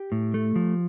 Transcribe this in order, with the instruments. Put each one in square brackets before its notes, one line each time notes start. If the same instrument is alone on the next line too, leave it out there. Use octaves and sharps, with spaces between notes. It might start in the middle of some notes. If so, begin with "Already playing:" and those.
Already playing: [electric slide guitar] G4
A2
A3
F3